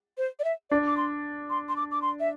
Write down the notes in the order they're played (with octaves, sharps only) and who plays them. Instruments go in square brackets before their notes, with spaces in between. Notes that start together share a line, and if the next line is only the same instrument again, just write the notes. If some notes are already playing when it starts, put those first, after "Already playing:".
[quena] C5
D5
E5
[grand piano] D4 [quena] D5
[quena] D6
C6
C6
C6
D6
D6
C6
E5